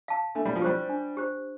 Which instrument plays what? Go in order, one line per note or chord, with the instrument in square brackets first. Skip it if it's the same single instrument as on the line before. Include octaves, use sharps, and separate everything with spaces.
[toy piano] F5 A5
[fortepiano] A3 [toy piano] D4
[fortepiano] G3
F3
[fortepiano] G3 [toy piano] G4 C5
[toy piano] D4
G4 C5